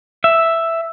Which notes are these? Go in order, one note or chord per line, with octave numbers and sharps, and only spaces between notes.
E5